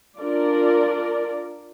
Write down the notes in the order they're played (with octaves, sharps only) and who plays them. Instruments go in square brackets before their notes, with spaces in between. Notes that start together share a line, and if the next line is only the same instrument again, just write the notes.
[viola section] D4 F4 A#4 D5